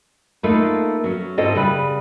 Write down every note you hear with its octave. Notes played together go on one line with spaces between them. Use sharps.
A3 A#3 D#4 F4 A4 B4
F#3 C#4
G#2 C4 E4 A4 D#5
C#3 G3 B4